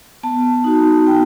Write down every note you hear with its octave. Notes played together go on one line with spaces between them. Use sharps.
B3 A5
D#4 F#4
B3 G5